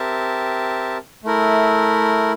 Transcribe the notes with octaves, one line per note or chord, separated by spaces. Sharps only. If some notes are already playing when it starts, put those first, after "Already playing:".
Already playing: C4 G4 A#4 E5 A5
A3 E4 A#4